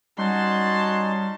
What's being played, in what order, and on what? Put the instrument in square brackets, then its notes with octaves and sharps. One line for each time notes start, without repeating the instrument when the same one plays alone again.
[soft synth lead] G3 [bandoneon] C#4 D#4 [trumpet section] F#4 A5 [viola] C6